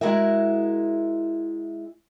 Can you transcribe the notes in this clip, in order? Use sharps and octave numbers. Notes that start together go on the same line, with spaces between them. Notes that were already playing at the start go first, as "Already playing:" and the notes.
G#3 E4 F#4 G#4 A#4 E5